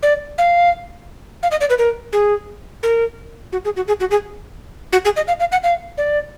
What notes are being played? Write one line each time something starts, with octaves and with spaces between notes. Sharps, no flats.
D5
F5
F5
D#5
D5
B4
A#4
G#4
A#4
F#4
G#4
F#4
G#4
F#4
G#4
F#4
G#4
D#5
F5
F5
F#5
F5
D5